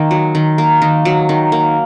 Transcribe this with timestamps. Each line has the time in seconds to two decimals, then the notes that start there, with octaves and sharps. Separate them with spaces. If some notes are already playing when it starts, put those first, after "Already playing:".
Already playing: D#3 A#3 F5
0.11 F#3
0.35 D#3
0.58 A#3
0.82 D#3
1.05 F#3
1.29 D#3
1.52 A#3